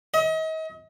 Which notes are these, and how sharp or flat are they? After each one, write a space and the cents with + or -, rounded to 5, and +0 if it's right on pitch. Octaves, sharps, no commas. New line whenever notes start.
D#5 +40